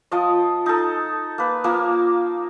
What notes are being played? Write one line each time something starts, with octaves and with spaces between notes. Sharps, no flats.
F3 D#5
D#4 A4
A#3 B4
F3 A#3 A#4